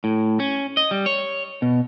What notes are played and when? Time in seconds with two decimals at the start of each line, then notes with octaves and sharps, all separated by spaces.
0.04 A2
0.40 C#4
0.77 D#5
0.91 G3
1.06 C#5
1.62 B2